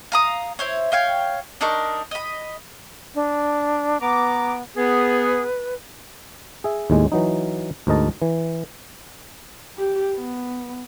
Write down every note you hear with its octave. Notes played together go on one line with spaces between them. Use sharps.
F5 A#5 D#6
E4 C5 C#5
C#5 F5 G5
D4 D#4 A#4 C#6
D#5 B5
D4
B3 A#5 D6
B3 G#4 B4
G#4 E5
D#2 A2 G#3
E3 F#3 D#4
D2 G#2 A#4 D#5 A5
E3
G4
B3